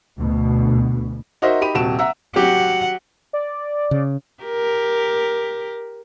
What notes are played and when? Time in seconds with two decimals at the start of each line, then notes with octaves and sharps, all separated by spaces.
0.19 D2 B2
1.42 D#4 F#4 A#4 C5 D#5 E5
1.61 D#4 G4 B5 D#7
1.75 D#1 C3 F#4 A5 D7 E7
1.99 E5 F#5 A#5 E6
2.36 F#3 G4 F#5
3.33 D5
3.91 C#3
4.44 G4 A#4